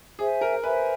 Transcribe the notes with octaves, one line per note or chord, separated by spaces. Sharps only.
G#4 C5 E5 G#5
A#4
B4 C5 E5 G#5